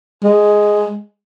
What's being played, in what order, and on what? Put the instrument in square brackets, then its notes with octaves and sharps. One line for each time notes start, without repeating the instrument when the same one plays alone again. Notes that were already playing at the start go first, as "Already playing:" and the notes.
[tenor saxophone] G#3